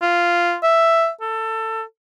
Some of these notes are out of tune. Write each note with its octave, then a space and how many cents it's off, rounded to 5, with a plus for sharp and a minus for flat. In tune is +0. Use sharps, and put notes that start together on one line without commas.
F4 -5
E5 +5
A4 +20